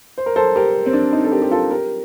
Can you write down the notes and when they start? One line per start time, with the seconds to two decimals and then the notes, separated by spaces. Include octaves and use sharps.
0.18 C5
0.26 A#4
0.36 A4 C5
0.56 G4 A#4
0.86 C4
0.93 D4
1.13 C4 D#4
1.24 A4
1.32 G4 A#4
1.42 G4
1.51 F4 A4
1.71 G4 A#4